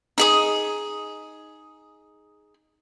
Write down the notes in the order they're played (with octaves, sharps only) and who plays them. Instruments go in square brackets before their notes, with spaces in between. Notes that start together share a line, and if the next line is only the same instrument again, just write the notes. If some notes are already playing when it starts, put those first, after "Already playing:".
[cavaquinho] D#4 G#4 D#6